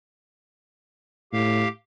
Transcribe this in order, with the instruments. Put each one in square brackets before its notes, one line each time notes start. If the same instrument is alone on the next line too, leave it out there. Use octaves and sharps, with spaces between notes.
[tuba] A2 [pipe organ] G4 F5